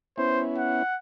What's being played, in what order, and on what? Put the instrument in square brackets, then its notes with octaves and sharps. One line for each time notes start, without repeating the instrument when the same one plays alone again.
[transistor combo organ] B3 C#4 E4 [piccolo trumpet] C5
[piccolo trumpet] F#5